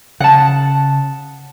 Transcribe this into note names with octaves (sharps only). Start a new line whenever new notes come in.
C#3 F#5 A5